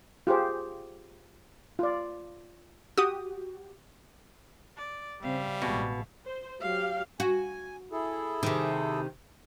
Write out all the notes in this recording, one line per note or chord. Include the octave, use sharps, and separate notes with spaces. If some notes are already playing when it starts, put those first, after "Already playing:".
F4 G4 G#4 C5
F4 D5
F#4 G4 D#6
D5
C#3 G3 C4 E5 F5
A1 B2 G#3
C5
F#3 G4 F5
F#4 G#5
E4 G#4 A4
C3 D#3